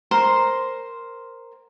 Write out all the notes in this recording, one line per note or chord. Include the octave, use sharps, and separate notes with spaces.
A#4 C5 C6